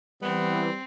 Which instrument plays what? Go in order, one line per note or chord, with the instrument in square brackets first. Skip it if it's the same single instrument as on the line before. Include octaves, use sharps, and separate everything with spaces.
[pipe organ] E3 [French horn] G3 [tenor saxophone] B3 [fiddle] C4